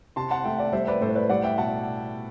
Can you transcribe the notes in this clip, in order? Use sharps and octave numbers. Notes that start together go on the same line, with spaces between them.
C3 A5 C6
F#5 A5
A3 E5 G5
D5 F#5
G3 C5 E5
B4 D5
A2 A4 C5
B4 D5
G3 D5 F#5
E5 G5
B2 F#5 A5